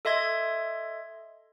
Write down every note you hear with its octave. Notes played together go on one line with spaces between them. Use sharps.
A4 D#5 E5 C6 G#6